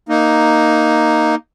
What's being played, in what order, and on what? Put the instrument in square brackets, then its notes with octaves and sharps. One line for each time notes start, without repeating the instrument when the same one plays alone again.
[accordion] A#3 D#4